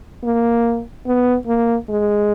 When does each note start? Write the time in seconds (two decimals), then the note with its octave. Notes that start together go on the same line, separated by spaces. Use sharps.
0.24 A#3
1.07 B3
1.47 A#3
1.89 G#3